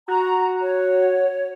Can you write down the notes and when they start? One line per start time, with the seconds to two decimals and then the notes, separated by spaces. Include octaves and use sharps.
0.08 F#4 A#5
0.61 C#5